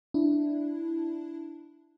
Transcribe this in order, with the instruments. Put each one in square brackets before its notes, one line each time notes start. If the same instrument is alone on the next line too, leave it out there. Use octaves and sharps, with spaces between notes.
[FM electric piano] D4 E4